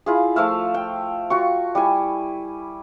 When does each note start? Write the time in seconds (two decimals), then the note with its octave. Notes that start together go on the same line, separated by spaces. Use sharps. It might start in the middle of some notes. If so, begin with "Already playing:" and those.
0.06 E4 F4 G#4
0.36 F3 A3 E5 F5
0.74 G5
1.30 F4 F#4 C#6
1.75 G3 E4 G#5